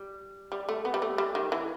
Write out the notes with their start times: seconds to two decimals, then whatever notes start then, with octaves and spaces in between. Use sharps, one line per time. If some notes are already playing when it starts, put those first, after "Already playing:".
Already playing: G3
0.52 G3
0.69 A3
0.85 B3
0.94 G3
1.02 A3
1.18 G3
1.35 D#3
1.52 E3